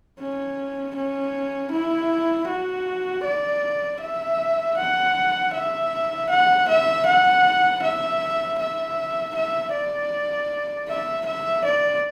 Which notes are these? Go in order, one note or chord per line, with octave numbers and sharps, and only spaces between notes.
C#4
C#4
E4
F#4
D5
E5
F#5
E5
F#5
E5
F#5
E5
E5
E5
D5
E5
E5
D5